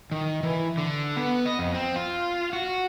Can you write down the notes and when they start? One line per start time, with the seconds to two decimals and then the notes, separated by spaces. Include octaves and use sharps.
0.11 D#3
0.43 E3
0.78 D3
1.16 B3
1.45 D#5
1.59 F2
1.74 C4
1.96 F4
2.53 F#4